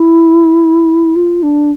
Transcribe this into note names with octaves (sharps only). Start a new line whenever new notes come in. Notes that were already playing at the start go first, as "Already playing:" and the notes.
Already playing: E4
F4
D4